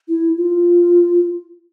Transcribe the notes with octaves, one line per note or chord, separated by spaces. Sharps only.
E4
F4